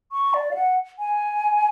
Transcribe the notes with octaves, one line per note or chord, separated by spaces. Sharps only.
C#6
D5
F5
F#5
G#5